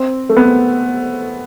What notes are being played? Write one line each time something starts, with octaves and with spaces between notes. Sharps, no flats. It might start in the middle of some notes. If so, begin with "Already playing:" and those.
Already playing: C4
A3
B3